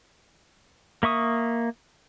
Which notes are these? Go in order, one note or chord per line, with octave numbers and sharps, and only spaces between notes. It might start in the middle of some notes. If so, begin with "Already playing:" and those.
A#3 E5 C#6 D#6